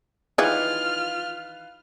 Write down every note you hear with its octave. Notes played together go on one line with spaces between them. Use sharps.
D#3 E3 F4 G#4 B4 F5 F6 F#6